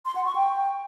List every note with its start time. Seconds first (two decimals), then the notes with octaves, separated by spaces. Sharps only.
0.05 C6
0.15 F#5
0.25 C#6
0.35 G5